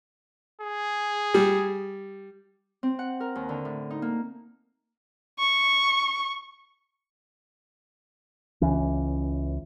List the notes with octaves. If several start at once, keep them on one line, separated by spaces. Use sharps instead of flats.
G#4
G3
C4
F#5
A#4
D#2
D3
A2
D#4
A#3
C#6
C#2 E3 C#4